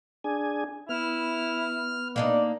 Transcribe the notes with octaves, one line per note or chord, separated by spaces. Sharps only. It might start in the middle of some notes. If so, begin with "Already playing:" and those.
D4 G#4 G#5
B3 E4 F6
A#3 D4 D#4 D5